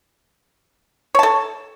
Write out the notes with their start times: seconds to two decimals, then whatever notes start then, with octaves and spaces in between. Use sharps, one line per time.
1.15 C#5
1.19 A5
1.23 A4